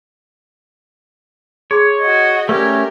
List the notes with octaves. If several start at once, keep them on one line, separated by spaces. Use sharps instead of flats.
G#4 C#5 C6
F#4 D#5
A3 C#4 G4 A#4 B4 D5 E5